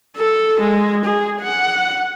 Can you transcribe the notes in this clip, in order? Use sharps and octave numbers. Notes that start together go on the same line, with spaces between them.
A4
G#3
G#4
F#5